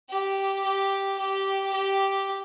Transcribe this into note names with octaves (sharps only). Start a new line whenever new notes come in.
G4
G4
G4
G4